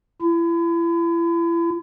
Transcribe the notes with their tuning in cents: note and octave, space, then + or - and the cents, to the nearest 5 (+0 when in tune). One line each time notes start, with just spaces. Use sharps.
E4 +35